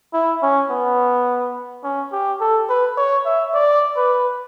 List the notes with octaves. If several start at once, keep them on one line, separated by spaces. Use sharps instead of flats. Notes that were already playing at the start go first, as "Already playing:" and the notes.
E4
C#4
B3
C#4
G4
A4
B4
C#5
E5
D5
B4